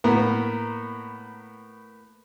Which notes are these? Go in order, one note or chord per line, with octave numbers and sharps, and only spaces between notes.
A2 A#3 B3 A#5